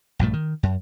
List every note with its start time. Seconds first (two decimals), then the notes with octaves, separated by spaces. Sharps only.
0.19 A#1 G2 A#2 A3
0.33 D#3
0.63 F#2